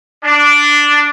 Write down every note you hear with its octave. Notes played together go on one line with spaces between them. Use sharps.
D4